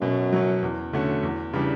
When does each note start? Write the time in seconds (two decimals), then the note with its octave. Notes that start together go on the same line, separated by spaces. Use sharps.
0.01 F#2 B2
0.33 F#3 C#4
0.63 E2
0.93 D3 A3 C#4 F#4
1.23 E2
1.54 C#3 E3 G3 D4